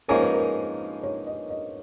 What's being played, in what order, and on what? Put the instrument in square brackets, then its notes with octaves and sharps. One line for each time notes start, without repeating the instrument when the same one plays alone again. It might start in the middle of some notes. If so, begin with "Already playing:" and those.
[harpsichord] G#2 F3 A#3 C#4 G#4 [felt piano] A#4
[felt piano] B4
A#4
C#5
D#5
D#5